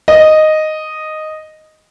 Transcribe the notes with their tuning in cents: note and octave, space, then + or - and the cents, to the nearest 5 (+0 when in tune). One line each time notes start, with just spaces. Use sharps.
D#5 -5